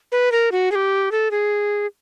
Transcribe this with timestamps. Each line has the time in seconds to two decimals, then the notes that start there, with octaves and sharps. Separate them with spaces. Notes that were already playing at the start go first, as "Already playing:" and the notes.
0.12 B4
0.32 A#4
0.52 F#4
0.72 G#4
0.75 G4
1.12 A4
1.31 G#4